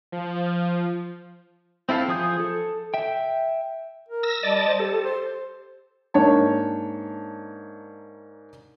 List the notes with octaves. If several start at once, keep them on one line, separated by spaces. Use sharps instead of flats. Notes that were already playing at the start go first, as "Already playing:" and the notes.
F3
C4 E4 A4 F5
F3 G#4 D#6 G6
A4
E5 G5
A#4
E6 A#6
G3 D5 D#5 A5
C5
G4 A4
C5
G#2 A#3 D4 C#5 A5